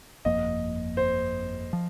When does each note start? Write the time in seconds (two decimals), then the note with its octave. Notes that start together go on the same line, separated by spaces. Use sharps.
0.25 G1 F2 F3 A#3 D#5
0.97 C5
1.73 F3